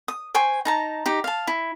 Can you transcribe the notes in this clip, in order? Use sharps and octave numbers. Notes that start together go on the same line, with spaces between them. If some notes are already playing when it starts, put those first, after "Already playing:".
D#6
C5 G5 G#5 C#6
D#4 A5 A#5
D#4 G4
F5 A5
E4